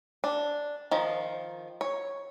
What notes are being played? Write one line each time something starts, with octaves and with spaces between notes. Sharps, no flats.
D4
D#3 F3
C#5